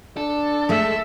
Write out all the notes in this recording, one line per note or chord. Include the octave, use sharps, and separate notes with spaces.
D4 A4
G#3 A3 E5